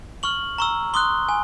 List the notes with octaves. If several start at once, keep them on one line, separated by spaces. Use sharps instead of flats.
C#6 F6 F#7
A#5 C#6 E6
C6 D#6 F#6 G7
G#5